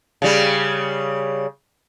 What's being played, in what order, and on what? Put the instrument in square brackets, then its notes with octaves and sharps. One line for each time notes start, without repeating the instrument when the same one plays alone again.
[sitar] C#3 G3